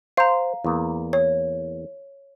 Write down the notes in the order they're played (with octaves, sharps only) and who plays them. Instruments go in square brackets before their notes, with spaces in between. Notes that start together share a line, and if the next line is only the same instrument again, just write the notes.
[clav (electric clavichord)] C5 [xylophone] F5 A#5
[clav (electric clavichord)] E2 A#3
[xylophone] C#5